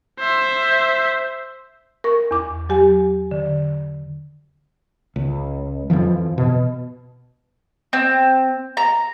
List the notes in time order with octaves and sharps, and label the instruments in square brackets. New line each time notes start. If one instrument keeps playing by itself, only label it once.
[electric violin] C5 E5
[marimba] A#4 C#6
E2 D6
F#3 G4 G#5
D3
[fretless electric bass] C#2
F2 C#3 E3 F3
B2
[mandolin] C4
A#5